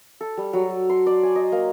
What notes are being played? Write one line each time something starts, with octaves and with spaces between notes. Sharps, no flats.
A4
G3
F#3
C6
D5
G#5
D#5
A#3